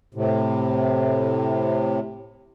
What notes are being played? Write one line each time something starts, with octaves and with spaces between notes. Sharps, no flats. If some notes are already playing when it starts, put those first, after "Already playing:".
A2 C3